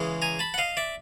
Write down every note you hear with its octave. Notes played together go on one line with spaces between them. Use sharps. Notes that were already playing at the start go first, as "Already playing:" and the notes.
Already playing: C#3 E3 G#3
G#5 A#5
A5 B5
F#5
D#5 F5
D5 E5